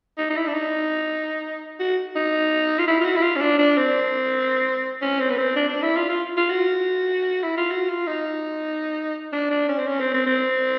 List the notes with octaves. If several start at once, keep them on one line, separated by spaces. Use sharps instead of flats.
D#4
D#4
E4
D4
D#4
F#4
D#4
F4
E4
F4
F#4
E4
F4
C#4
D4
D4
C4
C#4
C4
B3
C4
D4
D4
E4
F4
F4
F4
F#4
E4
F4
F#4
F4
D#4
D4
D4
C#4
C4
C#4
C4
C4
C4